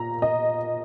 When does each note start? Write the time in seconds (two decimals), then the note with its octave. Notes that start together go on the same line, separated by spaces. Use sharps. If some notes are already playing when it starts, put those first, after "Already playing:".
Already playing: A#2 A#5
0.22 D#5